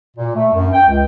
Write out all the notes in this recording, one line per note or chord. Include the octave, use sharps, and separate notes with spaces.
A#2
A3
F#2
G5
C#2